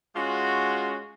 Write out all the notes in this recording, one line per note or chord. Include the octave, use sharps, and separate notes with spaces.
G#3 C#4 F4 F#4